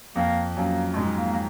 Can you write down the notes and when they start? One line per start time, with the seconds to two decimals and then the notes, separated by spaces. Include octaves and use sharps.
0.16 F2 A#3
0.56 F#2 A#3
0.93 A3
0.97 G#2 G#3
1.17 A#3
1.33 A#3